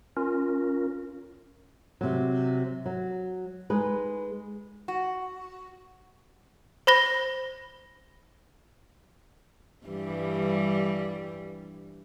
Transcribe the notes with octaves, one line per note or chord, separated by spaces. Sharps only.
C#4 F4 A#4
C3 F#3
F#3
G#3 D#4 G#4 B4
F#4
C5 B5 A#6 G7
G2 E3 G3